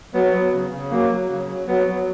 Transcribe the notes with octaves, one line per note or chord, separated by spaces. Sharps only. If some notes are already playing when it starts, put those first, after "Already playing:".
F#3 B3
F#3
C#3
C#3
F#3 A#3
F#3
C#3
F#3
F#3 B3
F#3